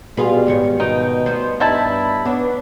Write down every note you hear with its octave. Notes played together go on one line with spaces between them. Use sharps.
B2 G3 F4 G#4 B4
G#2 D#3 C#5
B2 D#4 G5
G3 B3 C5
G2 D#4 E4 A5 B5
B3 D4 C#5